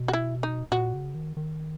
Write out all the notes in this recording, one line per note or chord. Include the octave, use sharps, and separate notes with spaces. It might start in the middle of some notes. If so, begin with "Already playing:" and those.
Already playing: B2
F#4
E4
D#4
A#2 F#4
C#3
D#3
D#3